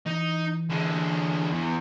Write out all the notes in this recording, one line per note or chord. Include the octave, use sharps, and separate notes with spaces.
E3 D#4
D3 G#3
E2